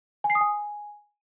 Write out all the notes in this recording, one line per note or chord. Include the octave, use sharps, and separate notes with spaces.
G#5
C7
D#6
G#5